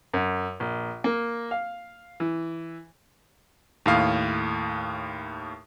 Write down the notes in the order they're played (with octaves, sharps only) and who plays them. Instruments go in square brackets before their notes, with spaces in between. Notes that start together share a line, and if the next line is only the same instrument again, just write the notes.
[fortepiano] F#2
A#1
A#3
F5
E3
[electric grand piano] D#2 A2 F5